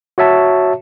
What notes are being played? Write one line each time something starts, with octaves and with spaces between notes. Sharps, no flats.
F#4 C#5 E5 A5